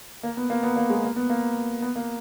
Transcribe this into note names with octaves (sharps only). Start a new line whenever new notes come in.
A#3
B3
A#3
B3
A#3
G#3
A#3
B3
A#3
B3
A#3